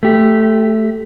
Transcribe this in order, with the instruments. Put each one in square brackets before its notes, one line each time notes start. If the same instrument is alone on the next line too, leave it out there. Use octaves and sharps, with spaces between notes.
[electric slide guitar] A3 G4